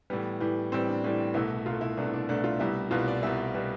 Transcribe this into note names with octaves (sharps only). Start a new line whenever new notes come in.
A2 E3 G3 B3
A2 E3 G3
A2 E3 G3 C4
D4
A2 E3 G3
C2 B2 A3 E4
C2 B2 A3 F4
E4
C2 B2 A3 D4
D4
C2 B2 A3 D4
F4
C2 B2 G3 E4
C2 B2 G3 F4
D5
C2 B2 G3 E5
B2 G3